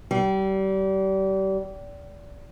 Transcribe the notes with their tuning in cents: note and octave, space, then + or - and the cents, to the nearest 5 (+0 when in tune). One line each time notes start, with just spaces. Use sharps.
G3 -30